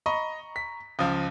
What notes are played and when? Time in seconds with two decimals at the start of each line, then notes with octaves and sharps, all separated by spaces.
0.06 D#5 A#5 B5 C#6
0.56 B6
0.99 C#2 F3 D#6